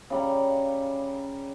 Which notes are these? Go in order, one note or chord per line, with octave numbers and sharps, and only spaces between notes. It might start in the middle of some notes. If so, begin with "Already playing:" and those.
C#3 G3 A#5